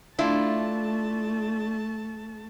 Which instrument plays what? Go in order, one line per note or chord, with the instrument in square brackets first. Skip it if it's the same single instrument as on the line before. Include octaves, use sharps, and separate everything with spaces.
[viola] A3 A5 [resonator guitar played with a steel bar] D4 E4 F4